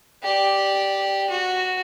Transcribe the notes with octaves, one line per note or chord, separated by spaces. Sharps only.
G4 D5
F#4